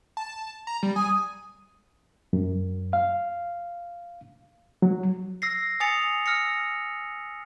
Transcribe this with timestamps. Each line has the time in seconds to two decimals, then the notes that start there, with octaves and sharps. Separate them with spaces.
0.17 A5
0.67 A#5
0.83 G3
0.96 G#5 D#6
2.33 F#2
2.93 F5
4.82 F#3
5.42 E6 A#6 C7
5.80 G#5 D#6 A6 C#7 F7
6.26 E6 F6 A#6 C#7